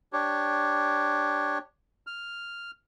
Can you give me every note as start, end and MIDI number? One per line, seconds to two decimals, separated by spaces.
0.13 1.58 62
0.13 1.58 67
0.13 1.58 73
2.07 2.71 89